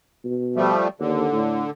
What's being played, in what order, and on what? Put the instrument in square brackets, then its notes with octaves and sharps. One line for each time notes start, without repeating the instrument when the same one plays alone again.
[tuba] B2
[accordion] F3 G3 A3
[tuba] D#2 [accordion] D3
[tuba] A2